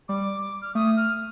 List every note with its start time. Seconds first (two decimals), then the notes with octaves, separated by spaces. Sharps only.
0.08 G3 D6
0.62 F6
0.75 A3 D#6
0.97 F6